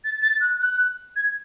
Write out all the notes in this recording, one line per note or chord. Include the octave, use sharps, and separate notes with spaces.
A6
A6
F#6
F#6
G#6